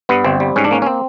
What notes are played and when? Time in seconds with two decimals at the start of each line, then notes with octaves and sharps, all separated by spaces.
0.09 G2 B3
0.24 G1 C4
0.40 G3
0.56 G#2 C#4
0.64 D4
0.71 A#3 C#4
0.82 C#4
0.86 C4